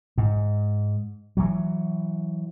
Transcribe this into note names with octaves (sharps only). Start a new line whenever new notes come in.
G#2
E3 F#3